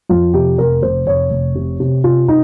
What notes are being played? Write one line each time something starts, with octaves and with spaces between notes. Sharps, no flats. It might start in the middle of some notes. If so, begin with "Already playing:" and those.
F2 F4
C3 G4
F1 A#4
F1 C5
F1 C#5
F1
C3
C3
C3 F4
C3 D#4